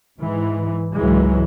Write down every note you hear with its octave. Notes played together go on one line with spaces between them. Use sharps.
G#2 E3
C#2 G#2 E3 F#3 G#3